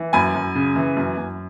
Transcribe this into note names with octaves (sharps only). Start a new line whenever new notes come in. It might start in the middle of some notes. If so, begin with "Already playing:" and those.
Already playing: E3
F#2 G#5 B5
F#2
C#3
E3
F#2
F#2